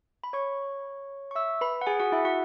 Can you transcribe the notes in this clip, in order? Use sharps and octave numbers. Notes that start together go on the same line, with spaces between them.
B5
C#5 C#6
C#6
E5 E6
B4 B5
F#5
G#4 G#5
F#4 F#5
E4 E5
F#4 F#5